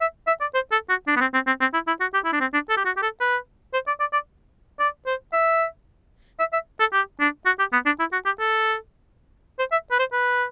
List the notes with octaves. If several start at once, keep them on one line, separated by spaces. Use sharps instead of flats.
E5
E5
D5
C5
A4
F#4
D4
B3
C4
C4
C4
C4
E4
E4
F#4
G4
E4
D4
C4
D4
A4
G4
F#4
G4
A4
B4
C5
D5
D5
D5
D5
C5
E5
E5
E5
A4
G4
D4
F#4
G4
B3
D4
E4
F#4
G4
A4
C5
E5
B4
C5
B4